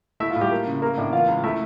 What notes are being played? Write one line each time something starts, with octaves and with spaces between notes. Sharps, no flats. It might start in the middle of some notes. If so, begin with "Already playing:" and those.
A3 E4 E5
F4
A2
G3 G4
A#3
C#3
A#3 A#4
A2 D4 D5
E3 F4 F5
C#2
A3 E4 E5